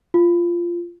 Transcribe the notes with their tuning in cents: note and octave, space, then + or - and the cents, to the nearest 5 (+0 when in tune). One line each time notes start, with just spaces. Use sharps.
F4 -15